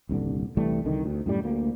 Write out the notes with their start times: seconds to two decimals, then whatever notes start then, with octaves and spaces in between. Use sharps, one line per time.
0.09 D#1 C2 G2 D3
0.57 C2 E3 G3 A3
0.85 C2 D3 D#3
1.04 D2
1.26 F#2 A2 G3
1.44 D2 A#3